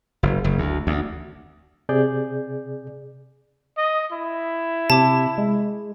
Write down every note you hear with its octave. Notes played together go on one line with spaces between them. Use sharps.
F#1
F#1
D2
D2
C3 G#4 D5 G6
D#5
E4
C3 A5 D6
G#3